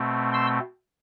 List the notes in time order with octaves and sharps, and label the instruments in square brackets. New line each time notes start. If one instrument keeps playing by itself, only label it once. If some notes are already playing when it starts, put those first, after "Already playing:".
Already playing: [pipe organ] B2 A3 C4
C6 E6